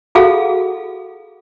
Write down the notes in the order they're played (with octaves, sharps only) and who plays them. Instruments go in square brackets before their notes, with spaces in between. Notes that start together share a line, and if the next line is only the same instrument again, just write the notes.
[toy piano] F#4 G#4 A4 F5 F#5